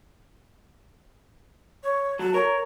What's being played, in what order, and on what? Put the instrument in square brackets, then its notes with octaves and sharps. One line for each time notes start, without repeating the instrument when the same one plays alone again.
[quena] C#5
[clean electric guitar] F#3 [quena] A5
[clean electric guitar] A#4 [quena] C#5